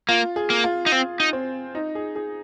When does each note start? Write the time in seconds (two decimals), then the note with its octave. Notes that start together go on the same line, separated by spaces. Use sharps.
0.09 A#3 F4
0.36 G#4
0.50 A#3
0.64 F4
0.86 D#4
0.92 C4 F4
1.20 D#4
1.33 C4
1.75 D#4
1.95 G#4
2.16 G#4